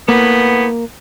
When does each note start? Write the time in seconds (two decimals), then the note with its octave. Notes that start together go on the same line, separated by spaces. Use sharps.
0.09 A2 A#3 B3